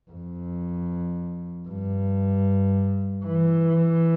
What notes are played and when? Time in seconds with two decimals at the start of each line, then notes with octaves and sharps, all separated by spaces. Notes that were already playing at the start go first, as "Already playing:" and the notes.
0.11 F2
1.68 G2
3.25 E3